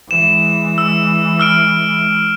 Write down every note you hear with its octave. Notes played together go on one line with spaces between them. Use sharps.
E3 G#3 E7
E6
E6 F6 D7